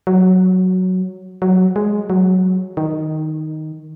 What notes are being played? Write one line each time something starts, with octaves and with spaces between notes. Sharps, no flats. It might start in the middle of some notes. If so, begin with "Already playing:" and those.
F#3
F#3
G#3
F#3
D#3